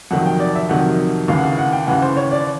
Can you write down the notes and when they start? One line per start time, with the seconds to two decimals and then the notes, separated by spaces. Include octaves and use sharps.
0.11 F2 C3 D#3 F#3 F#5
0.26 G5
0.40 D5
0.55 E5
0.69 F2 C3 D#3 F#3 F#5
1.28 D#2 C#3 E3 F5
1.38 F#5
1.43 F5
1.58 F#5
1.73 G5
1.87 D#2 C#3 E3 F#5
2.02 C5
2.17 C#5
2.32 D5